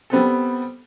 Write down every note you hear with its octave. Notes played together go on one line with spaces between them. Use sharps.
G3 B3 C4 A4